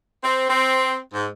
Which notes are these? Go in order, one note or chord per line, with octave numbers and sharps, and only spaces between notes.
C4
C4
G#2